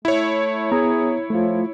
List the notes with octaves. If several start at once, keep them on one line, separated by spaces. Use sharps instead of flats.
A3 E4 C#5
B3 G#4 A#5
F3 A3 F4